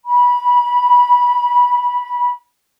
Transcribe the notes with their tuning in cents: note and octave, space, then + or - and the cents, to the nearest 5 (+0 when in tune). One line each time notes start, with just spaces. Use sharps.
B5 -20